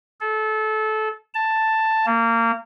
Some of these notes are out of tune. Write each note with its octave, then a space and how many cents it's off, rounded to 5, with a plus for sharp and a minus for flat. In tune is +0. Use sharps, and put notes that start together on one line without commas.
A4 -25
A5 +5
A#3 -25